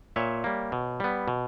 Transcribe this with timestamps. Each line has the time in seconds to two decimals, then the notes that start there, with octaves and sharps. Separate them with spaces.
0.16 A#2 C#5 E5
0.44 G3 A#3
0.72 B2
1.00 G3 B3
1.28 B2